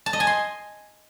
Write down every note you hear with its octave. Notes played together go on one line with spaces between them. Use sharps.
A5
D#5
G#5
C6